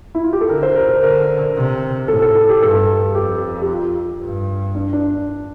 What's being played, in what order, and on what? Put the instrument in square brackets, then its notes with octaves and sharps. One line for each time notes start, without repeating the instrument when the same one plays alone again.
[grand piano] E4
F4
G4
A4
[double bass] D3 [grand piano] A#4
[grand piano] C5
A#4
A#4
[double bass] D3 [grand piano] A#4
[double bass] C3
[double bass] A2 [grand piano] A4
[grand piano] A4
A4
G4
[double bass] G2 [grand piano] A4
[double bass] F2 [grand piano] G4
[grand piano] G4
F4
[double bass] G2
[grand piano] D4
D4